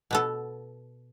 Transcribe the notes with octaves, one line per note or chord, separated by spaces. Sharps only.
B2 B3 A4